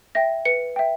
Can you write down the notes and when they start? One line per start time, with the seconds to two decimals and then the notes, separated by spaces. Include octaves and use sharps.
0.15 E5 G5 A#6
0.45 B4 C#7
0.76 E5 G5